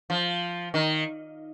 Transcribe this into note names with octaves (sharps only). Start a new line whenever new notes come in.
F3
D#3